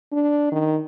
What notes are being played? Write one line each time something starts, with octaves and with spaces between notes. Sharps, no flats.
D4
D#3